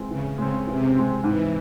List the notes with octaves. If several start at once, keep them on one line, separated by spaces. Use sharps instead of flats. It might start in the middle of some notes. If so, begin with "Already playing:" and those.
Already playing: E3 G#3 C4
C#3 E3
C#3 G#3 C4
C3 E3
G#3 C4
G#2 E3